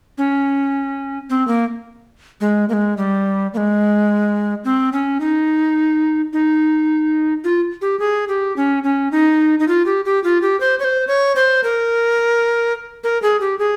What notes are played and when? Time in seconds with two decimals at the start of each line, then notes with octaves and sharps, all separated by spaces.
0.18 C#4
1.30 C4
1.48 A#3
2.41 G#3
2.69 A#3
2.73 G#3
2.97 G3
3.54 A#3
3.57 G#3
4.64 C4
4.93 C#4
5.20 D#4
6.33 D#4
7.44 F4
7.81 G4
8.00 G#4
8.28 G4
8.57 C#4
8.84 C#4
9.12 D#4
9.59 D#4
9.68 F4
9.86 G4
10.05 G4
10.24 F4
10.42 G4
10.60 C5
10.80 C#5
10.84 C5
11.07 C#5
11.36 C5
11.64 A#4
13.04 A#4
13.22 G#4
13.41 G4
13.59 G#4